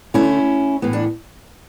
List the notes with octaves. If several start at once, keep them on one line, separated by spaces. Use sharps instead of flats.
D3 A3 C#4 E4
A2 E3 B3
D4